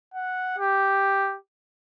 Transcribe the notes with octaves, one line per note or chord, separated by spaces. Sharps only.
F#5
G4